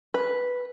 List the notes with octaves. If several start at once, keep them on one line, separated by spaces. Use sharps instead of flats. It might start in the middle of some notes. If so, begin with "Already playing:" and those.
B4